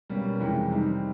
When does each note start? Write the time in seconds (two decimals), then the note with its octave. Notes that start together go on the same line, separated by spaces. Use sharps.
0.10 B2 G3 A#3 C#4
0.40 F2 C3 E3 G#3
0.69 C3 D#3 G3 C4 D#4